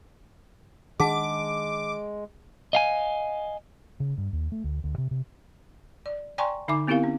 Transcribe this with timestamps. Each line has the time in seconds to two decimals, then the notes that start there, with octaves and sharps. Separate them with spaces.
1.00 D#3 G#3 D4 G#4 F#5 A5 D6
2.73 D#5 F5 G#5
4.00 C#3
4.18 G2
4.33 D#2
4.52 A3
4.64 D2
4.84 D2
4.98 C3
5.11 C3
6.06 D5
6.38 D5 G5 G#5 A#5 C6 C#6
6.68 D3 D#4 E5 G#5 D6
6.87 B3 C4 E4 G4 A#4 F5
7.04 C#4